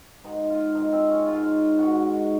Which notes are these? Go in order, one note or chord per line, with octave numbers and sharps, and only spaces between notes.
G#2 D#3 G#3 D#4
F4
G#2 D#3 G#3 D#4
C4
C#4
G#2 D#3 G#3 F4
G#2 D#3 G#3 F#4